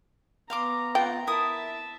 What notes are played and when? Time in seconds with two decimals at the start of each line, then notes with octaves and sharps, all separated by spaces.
0.50 B3 F5 A#5 C6 D6
0.95 F4 B4 F#5 G5
1.27 E4 A#4 E5 A5 D#6